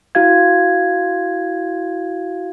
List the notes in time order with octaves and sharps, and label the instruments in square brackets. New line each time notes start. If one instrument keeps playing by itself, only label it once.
[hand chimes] E4 F#4 F5 G#6